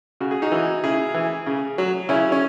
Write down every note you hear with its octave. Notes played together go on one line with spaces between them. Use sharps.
C#3 F#4
G#4
D#4 F#4
E3
C#3 E4 G#4
E3
C#3
F#3
C#3 C#4 E4
C#4